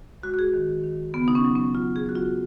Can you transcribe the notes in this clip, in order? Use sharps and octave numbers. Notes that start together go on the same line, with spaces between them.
G#3 F#4
F#4
G#4
D#3
D#3
C#3 B3
D#4
C#4
F#3
C#4
F#3 F4
G#4
F#3 F#4
F4